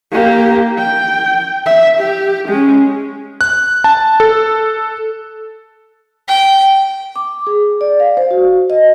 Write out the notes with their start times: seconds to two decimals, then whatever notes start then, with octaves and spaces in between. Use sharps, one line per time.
0.12 A#3 G4
0.78 G5
1.66 E5
1.99 G4
2.48 G#3 C#4
3.41 F#6
3.84 A5
4.20 A4
6.28 G5
7.16 D6
7.47 G#4
7.81 D5
8.00 F5
8.17 C5
8.31 F#4
8.70 D#5